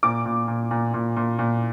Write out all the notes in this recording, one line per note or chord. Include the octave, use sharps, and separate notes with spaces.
A#2 D6
A#2
A#2
A#2
A#2
A#2
A#2